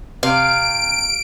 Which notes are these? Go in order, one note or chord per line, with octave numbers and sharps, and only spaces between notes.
C3 F5 D7